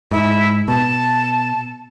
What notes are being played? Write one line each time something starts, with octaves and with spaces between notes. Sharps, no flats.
G#2 E4
B2 A5